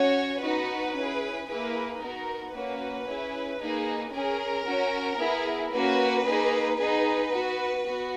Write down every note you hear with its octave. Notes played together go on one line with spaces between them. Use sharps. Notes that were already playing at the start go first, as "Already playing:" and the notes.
Already playing: C#4 F#4 C#5
B3 D#4 F#4 B4
C#4 E4 G#4
A#3 E4 G#4 B4
B3 D#4 F#4 A#4
A#3 C#4 F#4 B4
C#4 E4 G#4
A#3 D#4 G#4
C#4 G#4 A#4
C#4 F#4
B3 E4 G#4
A#3 C#4 F#4 B4
A#3 D#4 G#4
B3 D#4 G#4 B4
B3 F#4
B3 F#4